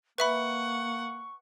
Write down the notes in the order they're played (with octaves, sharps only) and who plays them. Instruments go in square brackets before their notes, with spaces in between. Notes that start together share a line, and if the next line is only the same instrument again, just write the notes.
[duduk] A#3 [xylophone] B4 E5 B5 [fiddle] F#5 [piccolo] C#6